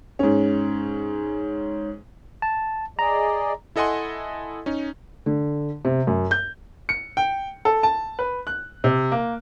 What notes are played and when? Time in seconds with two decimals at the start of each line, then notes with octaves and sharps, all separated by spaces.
0.19 G#2 C#4
2.42 A5
2.99 G#4 D5 D#5 A#5
3.76 E4 A4 D#5 F#5 G#5 C6
4.66 C#4 D#4
5.26 D3
5.85 C3
6.07 F#2
6.31 G6
6.89 C#7
7.17 G5
7.65 A4
7.83 A5
8.19 B4
8.47 F#6
8.84 C3
9.12 A#3